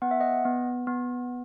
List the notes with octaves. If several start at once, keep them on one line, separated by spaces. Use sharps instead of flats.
B3 F#5
E5
D#5 F#5
B3
B3